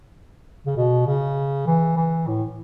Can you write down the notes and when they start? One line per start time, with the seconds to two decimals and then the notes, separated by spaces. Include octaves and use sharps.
0.66 C#3
0.76 B2
1.06 C#3
1.67 E3
1.97 E3
2.27 A2